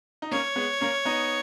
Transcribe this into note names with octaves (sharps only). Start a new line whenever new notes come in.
D#4
A#3 C#4 C#5
G#3 B3
A#3 C#4
B3 D#4